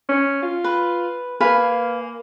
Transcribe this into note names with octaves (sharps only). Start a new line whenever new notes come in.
C#4
F4
B4
A#3 B4 F5 G#5